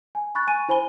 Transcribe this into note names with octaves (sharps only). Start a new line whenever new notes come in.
G#5
B5 C#6 F#6 A6
G#5 D#7
E4 C5 G#5 B5 G7